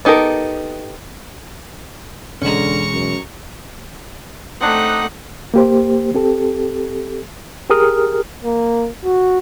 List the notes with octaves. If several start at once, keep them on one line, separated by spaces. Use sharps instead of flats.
B3 D#4 G4 A4 A#4
E1 D3 G#3 C#4 A#5 C#6
F#2
A3 C4 D4 D#4 F#5
A#3 G4 C5
C4 G4 A4
G4 G#4 A#4 D#6 F6
A#3
F#4